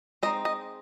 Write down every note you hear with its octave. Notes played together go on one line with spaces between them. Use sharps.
G#3 C4 D#4 D#5
D#5